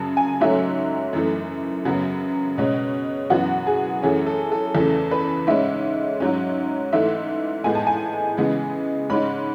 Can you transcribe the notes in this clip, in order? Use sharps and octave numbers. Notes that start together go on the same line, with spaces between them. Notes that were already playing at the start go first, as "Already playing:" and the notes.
Already playing: F#2 C#3 F#3 A5
G#5
G#2 F#3 A3 C#4 E5
F#2 E3 A3
F#2 C#3 F#3 B3
B2 G#3 C#4
F#2 E3 B3 F#4
G#4
F#2 E3 A3 C#4 G#4
A4
A4
E2 C#3 E3 A3 A4
B4
G#2 G#3 C#4 E5
G#2 F#3 C#4
G#2 E3 A3 E5
A2 G#3 B3 G#5
A5
G#5
C#3 E3 G#3 B3
G#2 G#3 C#4 B5